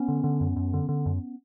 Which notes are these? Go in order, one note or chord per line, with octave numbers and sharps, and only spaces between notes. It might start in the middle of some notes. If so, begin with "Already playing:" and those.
Already playing: B3 C#4
D3
D3
F#2
F#2
D3
D3
F#2